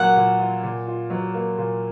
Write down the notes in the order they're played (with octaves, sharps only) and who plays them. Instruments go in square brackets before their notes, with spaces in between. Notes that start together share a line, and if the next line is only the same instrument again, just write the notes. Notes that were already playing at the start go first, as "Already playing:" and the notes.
Already playing: [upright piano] A#2 F#3 A#3 [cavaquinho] F#5
[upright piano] A#2
F4
A#2
F4
F#3
A#3
A#2